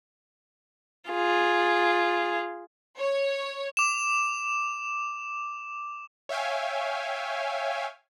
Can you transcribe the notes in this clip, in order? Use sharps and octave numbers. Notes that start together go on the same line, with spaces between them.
F4 G#4
C#5
D6 E7
C#5 E5 F5 G5 G#5